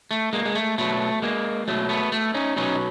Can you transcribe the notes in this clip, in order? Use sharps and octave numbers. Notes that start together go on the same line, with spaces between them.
A3
G#3 A#3
G#3
A3
B2 F#3 A3
G#3 A#3
B2 F#3 A3
A3 B3
A3
C#4 D#4
B2 F#3 C#4 D#4